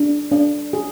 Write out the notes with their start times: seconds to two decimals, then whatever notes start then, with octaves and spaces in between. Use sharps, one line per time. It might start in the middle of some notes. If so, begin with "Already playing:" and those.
Already playing: D4
0.32 D4
0.73 G#4